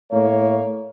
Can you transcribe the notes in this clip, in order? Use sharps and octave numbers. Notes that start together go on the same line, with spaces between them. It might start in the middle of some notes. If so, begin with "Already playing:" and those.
A2 A#3 C#5